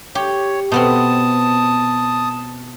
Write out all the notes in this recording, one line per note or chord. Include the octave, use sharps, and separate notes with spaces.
G4 C#5
B2 B3 C4 A5 D#6